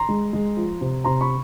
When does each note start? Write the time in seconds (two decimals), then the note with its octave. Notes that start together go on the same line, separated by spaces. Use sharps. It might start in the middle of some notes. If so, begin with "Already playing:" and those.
Already playing: A#5 C6
0.09 G#3
0.33 G#3
0.57 F3
0.81 C3
1.04 C3 A#5 C6
1.21 B5 C#6